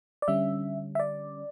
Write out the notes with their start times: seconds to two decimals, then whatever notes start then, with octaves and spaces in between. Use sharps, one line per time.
0.22 D5
0.28 D3 G3 C#4 E5
0.95 E5
0.99 D5